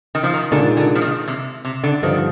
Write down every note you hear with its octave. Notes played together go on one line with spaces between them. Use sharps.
D#3
F3
D#3
A#2 D3 G#3 D#4
D3
F3
D#3
C3
C3
D3
G2 D3 D#3 F3